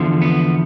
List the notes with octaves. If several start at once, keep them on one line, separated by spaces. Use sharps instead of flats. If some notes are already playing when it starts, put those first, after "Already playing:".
Already playing: E2 D3 F3
B3